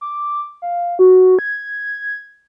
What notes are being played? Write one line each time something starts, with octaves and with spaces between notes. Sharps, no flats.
D6
F5
F#4
G#6